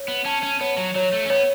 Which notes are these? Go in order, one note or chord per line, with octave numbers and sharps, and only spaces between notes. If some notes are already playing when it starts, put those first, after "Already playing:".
Already playing: C#5
B3
C#4 A5
C#4
B3 C#5
F#3
F#3 C#5
A3
C#4
B3 C#5